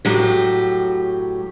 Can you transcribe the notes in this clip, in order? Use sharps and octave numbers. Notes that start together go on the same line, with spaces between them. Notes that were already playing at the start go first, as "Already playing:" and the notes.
A2 F#3 G4